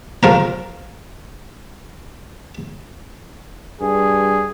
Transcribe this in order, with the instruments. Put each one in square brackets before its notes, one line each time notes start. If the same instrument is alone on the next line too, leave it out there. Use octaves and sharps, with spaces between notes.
[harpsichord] F3 A#4 A#5
[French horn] G2 [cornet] G#4